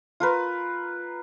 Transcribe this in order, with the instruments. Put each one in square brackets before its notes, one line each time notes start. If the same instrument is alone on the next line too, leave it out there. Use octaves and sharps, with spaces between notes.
[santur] F4 A#4 B4